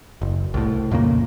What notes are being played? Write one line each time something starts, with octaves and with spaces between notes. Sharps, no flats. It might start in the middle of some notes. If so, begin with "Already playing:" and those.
F#1
C2 A2
F2 A#2 C#3 A#3